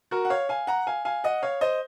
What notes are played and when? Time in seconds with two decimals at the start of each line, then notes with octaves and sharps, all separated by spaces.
0.11 F#4 A#4
0.25 F#5
0.30 C#5 F5
0.49 F5 G#5
0.67 F#5 A#5
0.87 F5 G#5
1.05 F5 G#5
1.24 D#5 F#5
1.43 C#5 F5
1.61 C5 D#5